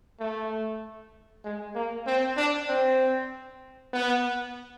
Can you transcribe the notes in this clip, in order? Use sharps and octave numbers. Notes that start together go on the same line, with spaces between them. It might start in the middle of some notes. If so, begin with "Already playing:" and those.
A3
G#3
A#3
C4
D4
C4
B3